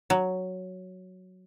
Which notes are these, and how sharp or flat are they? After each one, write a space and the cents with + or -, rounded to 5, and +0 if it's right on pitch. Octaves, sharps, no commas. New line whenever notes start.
F#3 +0